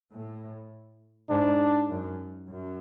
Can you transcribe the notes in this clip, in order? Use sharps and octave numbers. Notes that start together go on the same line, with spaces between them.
A2
G#2 D4
F#2
F#2